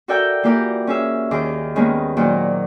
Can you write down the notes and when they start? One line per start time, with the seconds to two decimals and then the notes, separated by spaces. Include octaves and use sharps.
0.08 F#4 A4 A#4 D5 E5 G5
0.43 E3 A#3 F4 G4 A#4 D5
0.87 C#4 G#4 E5
1.31 D#2 D#3 G#4 D6
1.76 D#3 G#3 A#3 B3 C#4
2.17 A#2 D#3 F#3 C5 D5